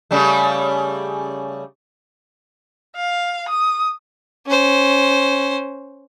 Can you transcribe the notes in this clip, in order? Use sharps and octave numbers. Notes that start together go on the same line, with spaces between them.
C#3 G3 A3
F5
D#6
C#4 C5